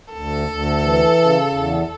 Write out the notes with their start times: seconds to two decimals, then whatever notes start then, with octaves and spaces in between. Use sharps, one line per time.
0.12 D2 A4
0.48 D2
0.83 E3
1.18 C#3
1.52 E2